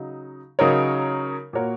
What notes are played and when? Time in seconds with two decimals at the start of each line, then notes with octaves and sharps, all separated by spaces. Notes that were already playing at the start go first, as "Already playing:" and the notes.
Already playing: C#3 F#3 D#4
0.59 C#3 F#3 D#4 A#4 C#5
1.53 A#2 A#3 F#4 A#4 C#5